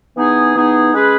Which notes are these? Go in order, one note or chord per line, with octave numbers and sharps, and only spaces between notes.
E3 B3 D#4 G#4
E3 B3 D#4 G#4
G#3 C#4 G#4 B4